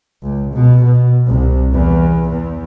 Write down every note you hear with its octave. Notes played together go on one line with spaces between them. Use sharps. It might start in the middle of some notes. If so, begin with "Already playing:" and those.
C#2
B2
B2
C2
E2
E2